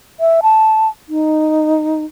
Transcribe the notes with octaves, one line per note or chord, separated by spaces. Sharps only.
E5
A5
D#4